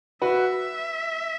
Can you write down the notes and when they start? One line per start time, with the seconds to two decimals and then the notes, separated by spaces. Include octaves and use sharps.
0.22 F#4 B4 E5